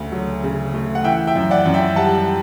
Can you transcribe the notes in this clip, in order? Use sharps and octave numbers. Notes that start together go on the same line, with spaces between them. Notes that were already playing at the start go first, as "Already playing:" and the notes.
Already playing: D2 C#3 A3
F#3
C#3
A3
F#5
E3 E5 G5
E5 G5
F#2
D5 F#5
F#2
E5 G5
G3 F#5 A5